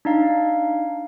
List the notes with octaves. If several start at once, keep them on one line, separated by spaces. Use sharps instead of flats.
D4 D#4 F5